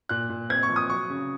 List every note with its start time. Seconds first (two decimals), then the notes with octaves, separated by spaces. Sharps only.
0.09 A#2 F#6
0.30 A#2
0.49 C4 G#6
0.63 C#6
0.70 F3
0.76 D#6
0.90 F#3 C#6
1.10 C#3